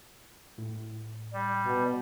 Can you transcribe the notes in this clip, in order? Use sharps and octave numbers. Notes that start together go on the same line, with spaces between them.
A2
G3
B2